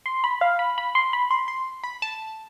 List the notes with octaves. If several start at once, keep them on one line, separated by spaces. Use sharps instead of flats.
C6
B5
F5
B5
B5
C6
B5
C6
C6
B5
A5